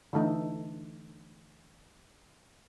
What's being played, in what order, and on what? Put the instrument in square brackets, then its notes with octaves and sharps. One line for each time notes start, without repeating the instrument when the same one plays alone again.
[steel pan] D3 E3 A3 D#4